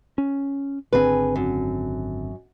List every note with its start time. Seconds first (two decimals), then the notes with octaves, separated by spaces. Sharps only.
0.18 C#4
0.93 G#1 D3 C4 G#4 B4
1.36 F#2